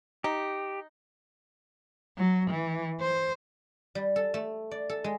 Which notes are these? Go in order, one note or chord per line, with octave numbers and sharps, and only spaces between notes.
D#4 G4
F#3
E3
C5
G3
A4
A3
D5
A4
G#3